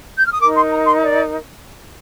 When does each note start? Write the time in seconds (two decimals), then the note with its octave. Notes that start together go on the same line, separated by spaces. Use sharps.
0.17 G6
0.25 F6
0.33 D#6
0.40 D#4 A#4 D6
0.56 C6
0.71 A#5
0.86 C6
1.02 D5